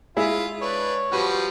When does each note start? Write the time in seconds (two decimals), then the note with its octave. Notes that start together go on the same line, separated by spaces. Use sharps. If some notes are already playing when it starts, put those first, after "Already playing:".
0.17 G#3 E4 F4 G#4 E5
0.61 D4 B4 C#5
1.12 F3 G3 F#4 B4